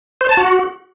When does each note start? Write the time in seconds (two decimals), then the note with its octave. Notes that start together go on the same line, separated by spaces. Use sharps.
0.21 C5
0.29 A5
0.37 F#4